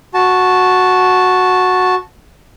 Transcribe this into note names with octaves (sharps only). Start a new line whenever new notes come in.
F#4 A5